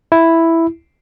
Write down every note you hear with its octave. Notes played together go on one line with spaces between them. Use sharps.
E4